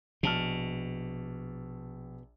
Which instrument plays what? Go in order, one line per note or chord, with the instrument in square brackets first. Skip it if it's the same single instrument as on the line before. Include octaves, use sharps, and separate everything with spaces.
[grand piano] A#1 A5 F6 [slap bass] B2